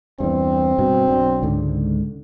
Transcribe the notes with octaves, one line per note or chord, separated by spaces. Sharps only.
E2 G2 C4
G2 B2
B1 F#3 D4
C#2 G#2 D3